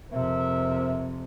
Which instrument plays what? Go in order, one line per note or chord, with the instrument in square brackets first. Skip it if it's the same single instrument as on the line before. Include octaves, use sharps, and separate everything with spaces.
[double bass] F2 C3 [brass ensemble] A#4 C5 E5